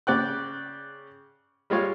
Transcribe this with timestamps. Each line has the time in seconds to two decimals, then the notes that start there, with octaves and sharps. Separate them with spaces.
0.07 C#3 D5 G5 F#6
1.70 G3 G#3 F4 C#5 F5